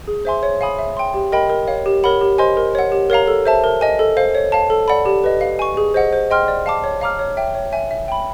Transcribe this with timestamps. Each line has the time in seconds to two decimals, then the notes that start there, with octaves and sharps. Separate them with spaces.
0.07 G#4
0.25 C5 E5 G#5 C6
0.43 C#5
0.61 F5 G#5 B5 D#6
0.79 E5
0.97 G5 C6
1.14 G4
1.32 A#4 D#5 G5 B5
1.50 A#4
1.68 C#5 F5
1.86 G4
2.04 A#4 C#5 F#5 B5
2.21 G4
2.38 C5 D#5 G#5 C6
2.57 A#4
2.75 C#5 F#5
2.92 G4
3.10 A#4 C#5 F5 A#5
3.28 A4
3.46 C5 E5 A5
3.64 A#4
3.81 D#5 G#5
3.99 A4
4.17 C5 F5
4.35 C#5
4.52 F5 A5
4.70 A4
4.88 D5 F#5 B5
5.06 G4
5.24 B4 D#5
5.41 F5
5.59 G#5 C#6
5.77 G#4
5.94 C5 D#5 F#5
6.13 C5
6.31 D#5 G5 C6 F6
6.48 D5
6.66 F5 A5 D6
6.84 C#5
7.01 F5 A#5 D6 F6
7.19 C#5
7.37 E5 G5
7.55 C#5
7.73 E5 G#5
7.91 E5
8.08 G5 B5